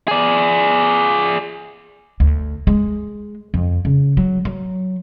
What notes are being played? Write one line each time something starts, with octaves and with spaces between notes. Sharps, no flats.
G#4 D5
D2
G#3
F2
C#3
F#3
F#3